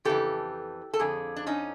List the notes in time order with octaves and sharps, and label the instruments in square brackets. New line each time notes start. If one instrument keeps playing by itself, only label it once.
[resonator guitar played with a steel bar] F2 C#3 E3 G4 A4
A4
F2 D3 F3 G#4
D4
C#4 D#4